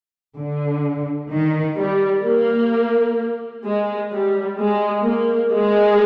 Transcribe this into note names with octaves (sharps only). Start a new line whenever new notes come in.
D3
D#3
G3
A#3
G#3
G3
G#3
A#3
G#3